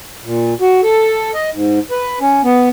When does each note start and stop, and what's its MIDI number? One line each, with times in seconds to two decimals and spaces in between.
0.24 0.54 46
0.61 0.81 66
0.83 1.31 69
1.34 1.50 75
1.54 1.79 44
1.91 2.19 71
2.21 2.42 61
2.44 2.69 59